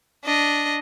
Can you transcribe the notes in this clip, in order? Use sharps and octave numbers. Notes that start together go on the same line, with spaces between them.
D4 D#5